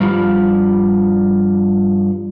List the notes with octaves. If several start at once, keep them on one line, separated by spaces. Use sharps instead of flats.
G2 F3 G3